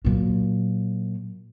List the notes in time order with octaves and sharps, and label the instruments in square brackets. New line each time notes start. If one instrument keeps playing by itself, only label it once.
[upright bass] A#2 F#3